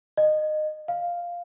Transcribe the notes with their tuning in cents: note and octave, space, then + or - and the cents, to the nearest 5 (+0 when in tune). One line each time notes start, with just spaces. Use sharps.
D#5 -20
F5 +0